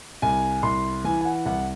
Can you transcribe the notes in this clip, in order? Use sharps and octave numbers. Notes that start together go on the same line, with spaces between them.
C2 G#5
C2 C6
E3 G#5
G#5
F#5
C2 F#5